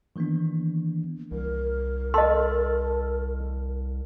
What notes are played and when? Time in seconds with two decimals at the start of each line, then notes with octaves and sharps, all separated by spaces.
0.16 D#3 E3 A#3 B3 D4
1.31 C2 A#4
2.14 A4 D#5 C6